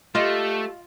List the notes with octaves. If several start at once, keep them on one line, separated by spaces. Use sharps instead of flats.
A3 F4 G4 D#5 F5 D6